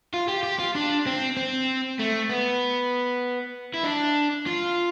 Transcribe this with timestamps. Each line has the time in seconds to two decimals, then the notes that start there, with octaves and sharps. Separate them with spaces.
0.14 F4
0.28 G4
0.43 G4
0.59 F4
0.75 D4
1.06 C4
1.37 C4
1.99 A3
2.29 B3
3.74 E4
3.84 D4
4.47 F4